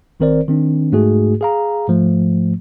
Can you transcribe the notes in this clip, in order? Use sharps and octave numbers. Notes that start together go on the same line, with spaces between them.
G#1 D#3 C4 A#4 C5 D5
D#3 C4 D4
G#2 A3 F#4 G#4
G#4 F5 A#5
G#2 F3 A3